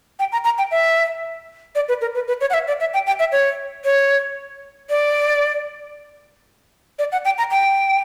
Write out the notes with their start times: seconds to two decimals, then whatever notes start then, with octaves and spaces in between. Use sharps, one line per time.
0.19 G5
0.32 A#5
0.44 A#5
0.58 G5
0.71 E5
1.75 D5
1.88 B4
2.01 A#4
2.15 B4
2.28 B4
2.41 C#5
2.50 F#5
2.54 E5
2.67 D5
2.80 E5
2.94 G5
3.07 G5
3.19 E5
3.32 C#5
3.85 C#5
4.90 D5
6.99 D5
7.12 F#5
7.25 G5
7.38 A#5
7.51 G5